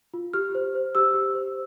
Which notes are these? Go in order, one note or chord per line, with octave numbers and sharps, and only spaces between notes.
F4
G4 F6
C5
C5
G4 E6
G4
C5